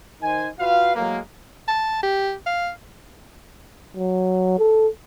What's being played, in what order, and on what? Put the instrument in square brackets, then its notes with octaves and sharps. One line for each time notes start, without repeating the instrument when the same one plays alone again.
[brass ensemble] D#3 D#4 C5 G#5
F4 F#4 B4 F5
A2 F#3 G#3 A#3
[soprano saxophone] A5
G4
F5
[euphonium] F#3
A4